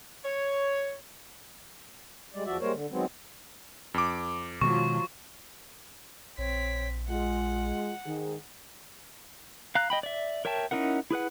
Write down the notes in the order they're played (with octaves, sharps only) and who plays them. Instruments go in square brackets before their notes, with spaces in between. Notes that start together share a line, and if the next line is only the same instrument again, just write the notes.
[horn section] C#5
[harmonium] G3 G#3 D5
E2 F3 F#4 D5 E5
G3 G#3 A#3 A#4 C5 C#5
D3
D#3 F#3 G#3 B3 C4
[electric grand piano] F2 D6
[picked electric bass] B2 D#3 G#3 [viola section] F3 F#3 F4 [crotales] C#6
[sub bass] A#1 [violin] C4 B6 [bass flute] C#5
[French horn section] G#3 [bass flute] F4 [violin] F#5
[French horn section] G#2 G#4 [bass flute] D#3
[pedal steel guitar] F5 A#5 F#6
D#5 G5 B5
D5 E5
A#4 C#5 E5 G5 A5
C#4 D#4 E4 A#4 F#5
E4 G#4 B4 F#5